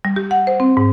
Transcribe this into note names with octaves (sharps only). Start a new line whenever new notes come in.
G3
G4
F#5
C5
C4
G#2